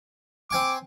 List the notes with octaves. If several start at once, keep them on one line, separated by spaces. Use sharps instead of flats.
C4 G#5 C#6 D6